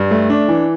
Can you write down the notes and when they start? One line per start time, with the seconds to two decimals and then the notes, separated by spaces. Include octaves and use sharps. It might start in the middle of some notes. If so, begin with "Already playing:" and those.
Already playing: G2
0.11 A3
0.30 D4
0.48 E3